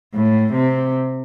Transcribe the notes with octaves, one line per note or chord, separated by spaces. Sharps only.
A2
C3